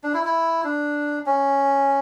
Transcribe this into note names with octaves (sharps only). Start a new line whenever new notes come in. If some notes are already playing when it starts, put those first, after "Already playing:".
D4
E4
E4
D4
C#4